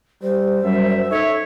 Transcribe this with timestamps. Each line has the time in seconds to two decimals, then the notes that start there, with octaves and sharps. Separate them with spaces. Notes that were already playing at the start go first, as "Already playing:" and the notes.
0.22 G3 C5
0.63 F#2 G3 E5
1.11 D#4 A4 C#5 E5